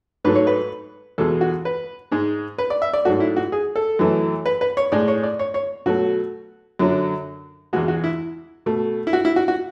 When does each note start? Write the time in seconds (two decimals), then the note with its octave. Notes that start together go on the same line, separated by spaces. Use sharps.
0.25 G#2 F#3 A3 B4
0.35 C#5
0.47 B4
1.18 E2 B2 G#3 A4
1.41 F#4
1.65 B4
2.12 G#2 G#3
2.58 B4
2.70 D5
2.82 E5
2.93 D5
3.05 G#2 F#3 A3 F#4
3.20 E4
3.37 F#4
3.52 G#4
3.76 A4
3.99 F#2 E3 A3
4.46 B4
4.61 B4
4.77 C#5
4.92 A2 G#3 D5
5.08 C#5
5.23 D5
5.39 C#5
5.54 C#5
5.86 B2 F#3 A3 F#4
6.79 F#2 D3 F#3
7.73 E2 B2 G#3 F#4
7.88 F#4
8.04 E4
8.66 B2 A3
9.07 E4
9.13 F#4
9.25 E4
9.36 F#4
9.48 F#4